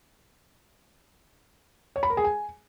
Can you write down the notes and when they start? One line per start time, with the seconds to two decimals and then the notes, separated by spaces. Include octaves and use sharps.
1.96 C#5
2.03 B5
2.10 A#4
2.17 G#4
2.24 G#5